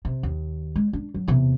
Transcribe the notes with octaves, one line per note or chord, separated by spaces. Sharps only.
C3
D#2
G#3
D4
F#3
E2 C3